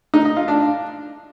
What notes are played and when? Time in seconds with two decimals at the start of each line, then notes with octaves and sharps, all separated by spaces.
0.14 D#4
0.25 D#5
0.37 F4
0.48 D4